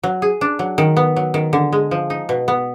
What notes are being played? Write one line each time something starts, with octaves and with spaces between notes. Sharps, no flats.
F#3
G#4
D4
F#3
D#3
B3
F#3
D#3
D3
G#3
F3
D#4
B2
B3